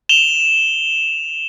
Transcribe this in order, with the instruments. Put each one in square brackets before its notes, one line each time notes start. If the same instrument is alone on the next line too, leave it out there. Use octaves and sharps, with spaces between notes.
[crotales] E7 F7 G7